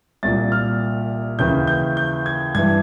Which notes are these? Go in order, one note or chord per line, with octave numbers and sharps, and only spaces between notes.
C2 A#2 A6
F6
D#2 C#3 E3 G6
G6
G6
G#6
G2 E3 G#6